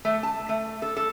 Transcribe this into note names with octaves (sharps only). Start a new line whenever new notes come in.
A3
A5
A3
A4
A4